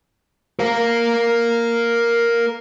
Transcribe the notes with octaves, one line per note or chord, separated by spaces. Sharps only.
A#4 F5